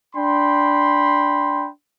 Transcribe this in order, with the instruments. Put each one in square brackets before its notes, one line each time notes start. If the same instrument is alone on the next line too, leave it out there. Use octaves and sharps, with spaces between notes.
[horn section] D4 G5 B5 C6